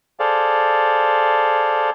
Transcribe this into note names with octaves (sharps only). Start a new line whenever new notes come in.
G#4 A4 C5 D5 F5